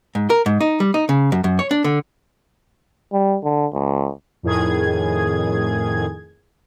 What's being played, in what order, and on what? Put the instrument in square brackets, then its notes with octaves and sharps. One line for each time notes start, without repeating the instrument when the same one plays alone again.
[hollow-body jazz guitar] G#2
A#4
G#2
D#4
G3
D#4
C#3
F#2
F#2
C#5
D4
D3
[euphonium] G3
D3
C#2
[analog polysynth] F2 A2 D#3 G#4 G#6